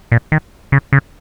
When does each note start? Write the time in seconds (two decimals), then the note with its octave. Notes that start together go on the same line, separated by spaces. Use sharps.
0.12 A#2
0.32 D#3
0.72 C#3
0.93 C#3